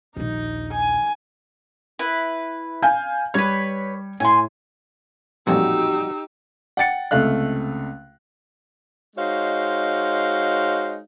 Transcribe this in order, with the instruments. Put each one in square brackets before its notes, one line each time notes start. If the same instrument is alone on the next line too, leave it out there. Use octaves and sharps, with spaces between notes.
[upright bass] A#1 D#2 [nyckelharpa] D#4
[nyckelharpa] G#5
[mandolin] E4 B4
[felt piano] F5 G#5 G6
[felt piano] G3 G#6 [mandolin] B4 C#5
[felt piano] A2 [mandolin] G#5 C6
[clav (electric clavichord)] A1 F2 A#2 [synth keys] G3 F#4 [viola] D#4 G4 [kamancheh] E6
[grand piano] F#5 G5 A6 C#7
C#2 C3 A3 F5 F#6
[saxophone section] G#3 D#4 F#4 C5 C#5 F5